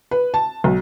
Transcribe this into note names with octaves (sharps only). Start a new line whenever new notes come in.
B4
A5
B1